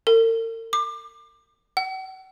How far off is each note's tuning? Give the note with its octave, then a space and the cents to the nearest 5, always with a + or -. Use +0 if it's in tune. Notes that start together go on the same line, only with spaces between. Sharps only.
A#4 -45
D6 +25
F#5 +45